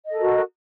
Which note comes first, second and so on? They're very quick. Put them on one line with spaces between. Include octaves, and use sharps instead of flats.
D#5 A4 A#4 F#4